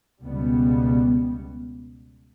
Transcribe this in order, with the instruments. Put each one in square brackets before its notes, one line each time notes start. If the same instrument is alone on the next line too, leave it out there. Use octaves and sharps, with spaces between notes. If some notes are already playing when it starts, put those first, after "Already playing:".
[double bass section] C#2 B2 G3 B3